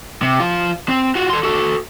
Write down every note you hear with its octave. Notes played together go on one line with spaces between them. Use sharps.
C3
F3 F4
C4
F4 F#4
A4 C6
F#4 A4